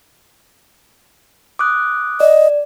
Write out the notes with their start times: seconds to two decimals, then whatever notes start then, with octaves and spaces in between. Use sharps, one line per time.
1.59 D6 D#6 F#6
2.20 D5 D#5